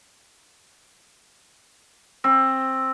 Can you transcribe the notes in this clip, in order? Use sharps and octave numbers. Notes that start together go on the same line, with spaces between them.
C4